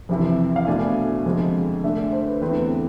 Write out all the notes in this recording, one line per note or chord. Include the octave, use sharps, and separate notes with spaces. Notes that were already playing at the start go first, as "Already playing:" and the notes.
F2 C3 E3
F5
B2 A3 D4 G#5
F2 D3 G#3
D3 A3 D4 E5
C5
B4
E2 D3 A3 C4 B4